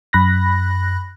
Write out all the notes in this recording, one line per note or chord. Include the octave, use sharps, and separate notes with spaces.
F#2 B5 F#6 A#6